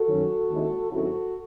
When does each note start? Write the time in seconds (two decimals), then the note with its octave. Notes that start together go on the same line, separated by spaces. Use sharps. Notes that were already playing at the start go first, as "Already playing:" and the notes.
Already playing: F#4 A4
0.08 F#2 D#3 F#3 C#4
0.50 D#2 D#3 G#3 C#4 E4
0.91 G#1 G#2 F#3 C#4 E4 F#4 A4